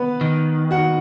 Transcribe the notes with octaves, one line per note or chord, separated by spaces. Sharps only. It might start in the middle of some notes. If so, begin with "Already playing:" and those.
Already playing: B3 B4
D#3
F#4 F#5